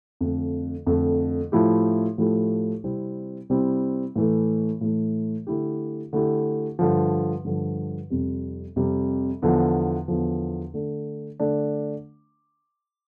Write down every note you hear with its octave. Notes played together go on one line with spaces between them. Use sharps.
F2 D3 A3
F2 D3 A3
A2 F3 A3 E4 G4
A2 F3 A3 E4 G4
C3 G3 C4 E4
C3 G3 C4 E4
A2 E3 A3
A2 E3 A3
D3 A3 E4 G4
D3 A3 E4 G4
G2 D3 F3
G2 D3 F3
F2 C3 G3
F2 C3 G3
E2 D3 F3
E2 D3 F3
D3 A3 D4
D3 A3 D4